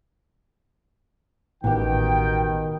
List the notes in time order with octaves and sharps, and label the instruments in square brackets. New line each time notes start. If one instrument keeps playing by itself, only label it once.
[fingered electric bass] A1 [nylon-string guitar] B2 G4 [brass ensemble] D#3 [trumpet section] G5